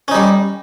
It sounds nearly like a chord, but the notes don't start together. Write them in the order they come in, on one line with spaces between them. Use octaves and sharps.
C#4 D#4 G3